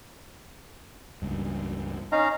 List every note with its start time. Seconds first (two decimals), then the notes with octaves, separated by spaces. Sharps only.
1.22 C#2 G2
2.12 C#4 D#4 F5 A#5